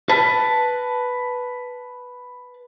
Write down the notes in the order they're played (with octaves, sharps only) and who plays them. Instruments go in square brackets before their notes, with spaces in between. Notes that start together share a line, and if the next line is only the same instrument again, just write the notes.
[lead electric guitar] B4 A5